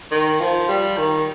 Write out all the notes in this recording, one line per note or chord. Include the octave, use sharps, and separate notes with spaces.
D#3
F3
G3
D#3